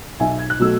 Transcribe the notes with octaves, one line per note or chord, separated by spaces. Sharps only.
B1 E5 G#5
G#6
F#6
B2 F#3 A3 E6